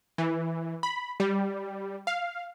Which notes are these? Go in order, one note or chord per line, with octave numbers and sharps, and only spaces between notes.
E3
B5
G3
F5